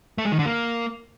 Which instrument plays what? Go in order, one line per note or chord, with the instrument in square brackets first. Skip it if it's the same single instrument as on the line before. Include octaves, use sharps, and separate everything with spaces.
[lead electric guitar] A3
G#3
D#3
D3
A#3